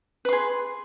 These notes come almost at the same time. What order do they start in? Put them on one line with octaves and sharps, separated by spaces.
B4 C6 G#4